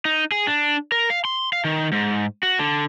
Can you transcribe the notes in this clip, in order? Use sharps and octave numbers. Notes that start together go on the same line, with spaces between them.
D#4
G#4
D4
A#4
F5
C6
F5
D#3
G#2
F#4
D3